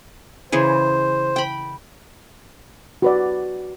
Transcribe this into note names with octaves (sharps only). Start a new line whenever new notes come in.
C#3 E3 G#4 C5
G5 B5
F#4 B4 D5